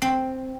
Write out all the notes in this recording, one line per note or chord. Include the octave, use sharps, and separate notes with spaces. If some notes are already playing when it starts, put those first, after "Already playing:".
C4